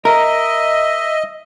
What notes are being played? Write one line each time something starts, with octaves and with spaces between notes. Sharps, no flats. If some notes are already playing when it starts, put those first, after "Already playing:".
A#4 D#5 E5